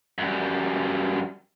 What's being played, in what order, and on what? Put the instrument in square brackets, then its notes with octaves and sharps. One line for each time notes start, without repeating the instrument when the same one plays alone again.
[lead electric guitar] F#2 G3